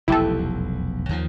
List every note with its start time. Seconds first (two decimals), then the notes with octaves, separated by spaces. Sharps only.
0.08 F1 B1 E2 E4 G4 A4
1.09 D#2 D#3 F3